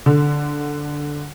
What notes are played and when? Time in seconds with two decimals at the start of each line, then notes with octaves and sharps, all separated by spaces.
0.06 D3